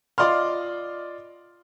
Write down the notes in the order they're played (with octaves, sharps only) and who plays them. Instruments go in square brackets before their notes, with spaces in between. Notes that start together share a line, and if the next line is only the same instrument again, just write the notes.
[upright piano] F4 D5 D#5 C6 F6